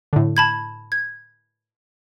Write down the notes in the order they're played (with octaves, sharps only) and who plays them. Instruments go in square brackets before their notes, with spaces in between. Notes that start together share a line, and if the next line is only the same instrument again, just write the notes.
[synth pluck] A2 D3
[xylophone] A5 B5 G#6
G#6